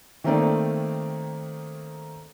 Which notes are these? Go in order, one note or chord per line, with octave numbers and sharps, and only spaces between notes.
D#3 A3 A#3 C4 D#4 D5